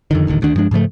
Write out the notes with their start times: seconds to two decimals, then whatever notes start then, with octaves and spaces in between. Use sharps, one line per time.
0.11 F2 D3 D#3
0.27 D#1 A1 D3 D#3
0.42 D2 D#3 D4
0.55 G2 F3 G#3 D4
0.71 G#2 C#3 F3 A3